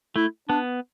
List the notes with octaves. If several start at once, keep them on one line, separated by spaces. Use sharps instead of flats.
A3 E4
B3 D4